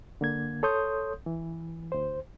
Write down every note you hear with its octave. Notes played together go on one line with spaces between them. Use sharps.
D3 A#3 G#6
A4 C#5 C6 D#6 G6
E3
D2 C5